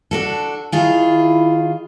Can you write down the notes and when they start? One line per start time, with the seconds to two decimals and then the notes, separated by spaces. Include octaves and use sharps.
0.11 D4 F#4 A4
0.72 D#3 E4 F4 G#4